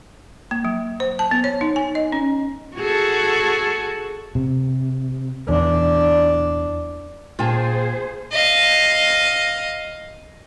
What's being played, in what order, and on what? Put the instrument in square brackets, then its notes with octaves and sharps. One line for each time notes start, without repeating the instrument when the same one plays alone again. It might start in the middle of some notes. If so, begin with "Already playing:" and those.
[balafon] A#3
F#3
C5
A5
B3
C#5
D#4
G#5
D#5
C#4
[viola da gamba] F#4 G#4 A4
[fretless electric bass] C3
[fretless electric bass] E2 E3 [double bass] D4
[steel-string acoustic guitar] A#2 [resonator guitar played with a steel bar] F4 G5 A5 [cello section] G#4 C5
[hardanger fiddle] D#5 F5